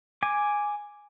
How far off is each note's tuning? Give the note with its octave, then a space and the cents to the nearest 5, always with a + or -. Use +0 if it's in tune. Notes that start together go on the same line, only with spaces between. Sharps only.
G#5 +0 D6 +0